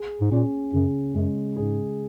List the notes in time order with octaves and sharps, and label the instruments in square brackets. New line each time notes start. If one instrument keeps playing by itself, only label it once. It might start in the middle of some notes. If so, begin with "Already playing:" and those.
Already playing: [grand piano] G#4
[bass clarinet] G#2
[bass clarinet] A#2 [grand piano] C#4
[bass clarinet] F#2 [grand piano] C#3
[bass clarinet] F#2 [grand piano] G#3
[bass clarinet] G#2 [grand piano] G#4